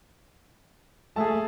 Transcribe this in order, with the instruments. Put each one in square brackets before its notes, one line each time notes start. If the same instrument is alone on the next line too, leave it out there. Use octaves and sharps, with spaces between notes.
[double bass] A3 [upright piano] G#4 E5 A5